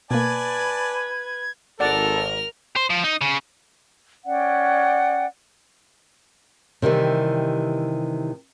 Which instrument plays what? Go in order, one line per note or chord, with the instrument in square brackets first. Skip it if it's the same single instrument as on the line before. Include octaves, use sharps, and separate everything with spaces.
[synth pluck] B2 A#3 [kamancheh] B4 [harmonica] D5 G#5 A5 [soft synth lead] G#6
[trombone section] G#1 [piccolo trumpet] A4 [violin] A#4 F6 [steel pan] D5 F#5 A5
[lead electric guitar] C5
F3
D#4
C#3
[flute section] C#4 D5 F#5 G5
[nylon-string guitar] C3 D#3 E3 G3